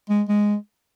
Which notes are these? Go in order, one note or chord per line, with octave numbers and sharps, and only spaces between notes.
G#3
G#3